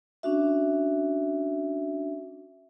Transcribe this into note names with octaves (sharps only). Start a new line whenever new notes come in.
C#4 D4 F#4 E5